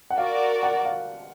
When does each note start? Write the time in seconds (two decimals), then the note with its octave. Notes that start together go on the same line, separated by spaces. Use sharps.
0.10 F#5
0.17 F#4 A#4 D5 F5
0.63 F#5
0.85 F5